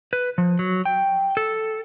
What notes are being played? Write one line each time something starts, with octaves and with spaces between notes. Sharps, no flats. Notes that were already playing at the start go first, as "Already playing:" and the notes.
B4
F3
F#3
G5
A4